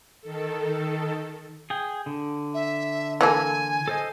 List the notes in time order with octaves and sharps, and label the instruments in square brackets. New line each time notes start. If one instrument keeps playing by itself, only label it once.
[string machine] D#3 A4
[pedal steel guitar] G#4 G5
D3
[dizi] E5
[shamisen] E3 A#3 A4 [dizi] G#5
[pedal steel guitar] A4 C5 D#5